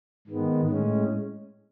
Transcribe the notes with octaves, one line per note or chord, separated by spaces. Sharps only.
G#2 D#3 G#3 B3
A2 G#3 C#4